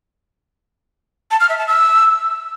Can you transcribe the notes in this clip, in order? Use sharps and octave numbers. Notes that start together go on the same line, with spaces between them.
A5
F6
E5
A5
E6